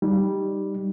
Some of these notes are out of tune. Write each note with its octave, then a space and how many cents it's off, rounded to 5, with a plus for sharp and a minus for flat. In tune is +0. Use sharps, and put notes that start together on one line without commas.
G3 +0 D#4 +0